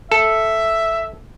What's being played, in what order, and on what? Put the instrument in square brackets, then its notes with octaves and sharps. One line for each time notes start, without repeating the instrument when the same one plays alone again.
[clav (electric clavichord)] A4 [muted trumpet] E5